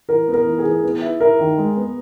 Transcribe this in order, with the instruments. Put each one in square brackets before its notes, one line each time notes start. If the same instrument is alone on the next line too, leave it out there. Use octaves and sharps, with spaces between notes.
[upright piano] E3 [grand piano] A#4
[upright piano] B3
[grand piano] A#4
[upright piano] E3
[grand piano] G#4
[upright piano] E3
B3
E4
[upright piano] E4 [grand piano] A#4
[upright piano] D#3
G#3
B3